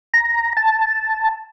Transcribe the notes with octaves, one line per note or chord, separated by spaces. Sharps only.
A#5
A5